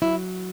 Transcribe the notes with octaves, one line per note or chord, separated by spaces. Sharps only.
F#3 E4